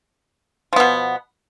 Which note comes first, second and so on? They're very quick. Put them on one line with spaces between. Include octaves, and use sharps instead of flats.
F3 B3 B2